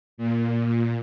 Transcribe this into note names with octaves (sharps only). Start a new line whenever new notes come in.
A#2
A#2